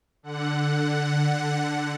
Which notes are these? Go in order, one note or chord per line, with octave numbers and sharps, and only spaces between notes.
D3 F#5